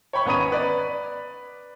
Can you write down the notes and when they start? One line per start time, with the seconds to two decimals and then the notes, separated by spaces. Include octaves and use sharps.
0.13 C#5 G5 B5 C#6
0.26 G#1 B3 C#4 A#5 D#6 D#7
0.52 B4 D5